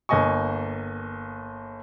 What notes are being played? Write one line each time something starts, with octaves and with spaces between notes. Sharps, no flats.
G1 A#3 D#5 G#5 C#6